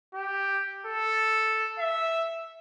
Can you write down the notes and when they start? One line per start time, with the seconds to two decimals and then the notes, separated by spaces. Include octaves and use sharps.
0.14 G4
0.86 A4
1.79 E5